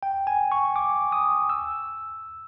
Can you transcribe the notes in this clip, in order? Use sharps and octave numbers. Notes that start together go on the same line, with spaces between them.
G5
G#5
C#6
D6
D#6
E6